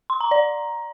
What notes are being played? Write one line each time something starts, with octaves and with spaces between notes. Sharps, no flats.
C6
A#5
D5